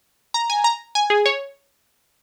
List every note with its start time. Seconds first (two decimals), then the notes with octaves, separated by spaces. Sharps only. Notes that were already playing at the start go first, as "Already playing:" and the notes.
0.34 A#5
0.50 G#5
0.64 A#5
0.95 G#5
1.10 G#4
1.26 C#5